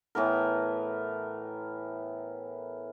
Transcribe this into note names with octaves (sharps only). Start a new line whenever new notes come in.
A2 E3 B3 A#4